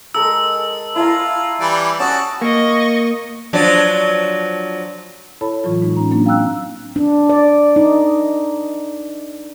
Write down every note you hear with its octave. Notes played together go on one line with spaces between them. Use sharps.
G#3 A4 A#4 E6
E4 F4 A5 A#5
E3 G3 D5
C#4 F#4 A5 D#6
A#3 D#5 C#6
F3 F#3 D4
E4 A4 C#5 A5 B5
A2 E3 F#3 F4
A2 G#3 D#4
A2 C#4 D#4 A#5
F#3 A#3 C4 D4 D#4
F5 G5 A#5 E6 F#6
D4
D5
D#4